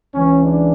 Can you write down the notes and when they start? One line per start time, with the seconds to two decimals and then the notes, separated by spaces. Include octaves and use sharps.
0.15 C#2 C#3 E3 C#4
0.44 D4